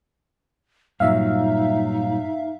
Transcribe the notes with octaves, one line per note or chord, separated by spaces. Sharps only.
G2 A#2 F#3 D#4 E5 F5